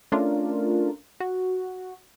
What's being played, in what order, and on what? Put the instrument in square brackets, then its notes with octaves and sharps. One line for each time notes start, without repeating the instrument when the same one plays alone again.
[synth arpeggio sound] A3 C#4 D4 F4 A#4
F#4